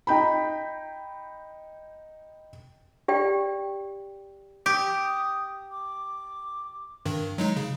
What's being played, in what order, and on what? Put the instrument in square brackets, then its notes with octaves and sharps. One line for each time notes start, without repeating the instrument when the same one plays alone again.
[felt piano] D#4 G5 B5
[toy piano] G4 D5 G5
[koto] G4 [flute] D#6
[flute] D6
[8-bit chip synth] G2 D#3
F#3 G#3 D#4
C#3